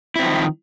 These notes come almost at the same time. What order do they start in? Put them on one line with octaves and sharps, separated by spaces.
E4 C4 F3 D#3